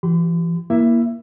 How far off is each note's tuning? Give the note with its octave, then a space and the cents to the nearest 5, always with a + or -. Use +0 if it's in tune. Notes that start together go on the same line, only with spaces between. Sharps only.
E3 +40 G4 -25 C6 -45
A#3 +15 E4 +0 E5 +15